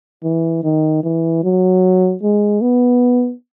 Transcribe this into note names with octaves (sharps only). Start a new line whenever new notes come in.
E3
D#3
E3
F#3
G#3
B3